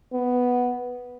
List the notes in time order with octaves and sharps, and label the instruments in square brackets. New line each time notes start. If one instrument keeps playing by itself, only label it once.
[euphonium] B3